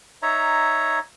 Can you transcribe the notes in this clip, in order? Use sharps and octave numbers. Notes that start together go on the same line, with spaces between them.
D#4 C#5 E5 A#5